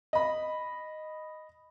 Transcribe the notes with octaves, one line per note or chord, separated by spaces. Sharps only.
D#5 B5